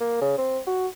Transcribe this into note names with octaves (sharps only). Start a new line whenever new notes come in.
A#3
C#3
C4
F#4